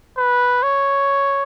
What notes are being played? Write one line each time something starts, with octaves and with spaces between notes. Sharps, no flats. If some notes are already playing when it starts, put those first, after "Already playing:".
B4
C#5